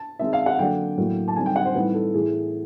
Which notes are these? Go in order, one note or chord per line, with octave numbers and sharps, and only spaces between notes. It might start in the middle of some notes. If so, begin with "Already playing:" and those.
Already playing: A5
D#3 G#3 C4 D#4 E5
F5
F#5
D3 F#3 A#3 D4 G5
A2 F#3 A#3
A5
D3 G3 C4 D#4 G#5
G5
F#5
C5
A2 E3 G3 C4 D#4 B4
A4
A2 E3 A3 G#4